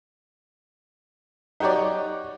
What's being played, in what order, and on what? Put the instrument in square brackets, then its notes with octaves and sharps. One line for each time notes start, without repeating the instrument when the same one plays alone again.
[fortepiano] D#4 F#4 G4 C#5 D5